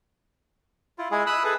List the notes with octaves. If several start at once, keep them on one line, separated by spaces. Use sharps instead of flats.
E4 F4
G#3 E4 G#4
B5 D#6 E6 F#6
G#4 A4 B4